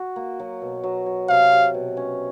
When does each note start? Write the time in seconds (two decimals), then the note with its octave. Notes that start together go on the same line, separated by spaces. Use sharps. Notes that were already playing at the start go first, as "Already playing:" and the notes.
Already playing: F#4
0.16 A#3
0.39 F#3
0.62 B2
0.83 F#3
1.06 F#3
1.29 C3 F5
1.52 C3
1.74 B2
1.97 C#4